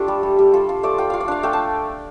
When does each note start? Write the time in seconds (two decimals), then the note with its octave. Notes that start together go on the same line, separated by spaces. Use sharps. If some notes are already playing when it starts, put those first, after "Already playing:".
Already playing: A3 D4 F4 G4 A4
0.08 G3
0.23 G3
0.39 G3
0.53 F4 A4
0.69 F4
0.83 A3 D5
0.98 F4 G5
1.10 F4 F5
1.20 D5
1.28 D4 F5
1.43 A3 G5
1.53 A5